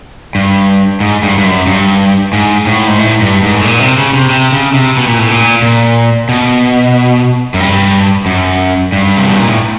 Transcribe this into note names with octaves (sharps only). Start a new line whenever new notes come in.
G2
G#2
G2
G2
F#2
G2
G#2
A2
G#2
A2
G2
G#2
A2
A#2
C3
C#3
C3
C3
C#3
C3
B2
A#2
A2
A#2
A#2
B2
F#2
G2
F#2
G2
C3
B2
A#2
A2